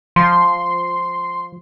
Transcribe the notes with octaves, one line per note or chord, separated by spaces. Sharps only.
F3 C6